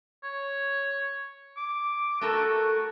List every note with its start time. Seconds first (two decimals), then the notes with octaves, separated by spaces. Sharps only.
0.24 C#5
1.57 D6
2.21 A3 F#4 A4 A#4